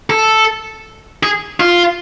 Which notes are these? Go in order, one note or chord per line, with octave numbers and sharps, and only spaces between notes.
A4
G#4
F4